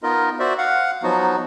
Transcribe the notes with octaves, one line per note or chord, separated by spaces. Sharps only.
B3 D#4 F4 A#4 D#5
F#4 C5 D5 E5
F5 F#5
F3 F#3 B3 D#4 F#4